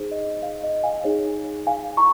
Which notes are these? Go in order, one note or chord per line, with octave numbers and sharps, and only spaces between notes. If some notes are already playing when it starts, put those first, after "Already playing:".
Already playing: D#4 G#4 C5
D#5
F5
D#5
F5 G#5
D#4 G#4 C#5
F5 G#5
A#5 C#6